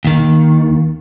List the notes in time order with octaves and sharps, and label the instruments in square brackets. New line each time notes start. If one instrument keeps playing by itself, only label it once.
[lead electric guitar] D#2 D#3